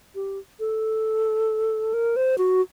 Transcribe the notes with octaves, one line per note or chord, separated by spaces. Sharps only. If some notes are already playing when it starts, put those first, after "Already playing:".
G4
A4
A#4
C5
F#4